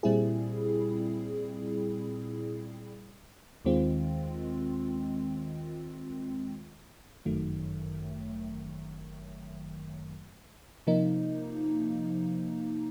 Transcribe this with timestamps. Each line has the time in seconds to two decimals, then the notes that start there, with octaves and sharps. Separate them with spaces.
0.03 A#2 G3 C4 E4 G#4
3.65 D#2 D#3 G#3 C4 F4
7.25 G1 F#2 D#3 F#3 A3
10.87 C3 F3 A#3 D#4